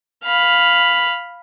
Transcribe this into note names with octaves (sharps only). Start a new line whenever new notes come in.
F5 B5